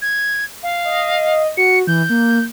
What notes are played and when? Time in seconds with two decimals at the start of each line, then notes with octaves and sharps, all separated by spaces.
0.02 G#6
0.63 F5
0.84 D#5
1.57 F#4 C#7
1.87 E3 G6
2.10 A#3